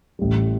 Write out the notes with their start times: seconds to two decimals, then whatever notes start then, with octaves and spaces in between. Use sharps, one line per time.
0.19 A1 A2 G3